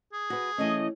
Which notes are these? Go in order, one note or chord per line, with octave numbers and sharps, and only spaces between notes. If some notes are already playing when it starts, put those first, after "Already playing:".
G#4
F#4 B4
E3 A3 C#4 D#5